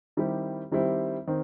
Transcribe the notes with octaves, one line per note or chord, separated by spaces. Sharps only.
D#3 G3 C4 E4 G4
D#3 G3 C4 E4 G4
D#3 C4